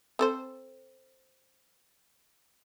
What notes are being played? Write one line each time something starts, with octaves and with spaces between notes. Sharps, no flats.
C4 A4 C5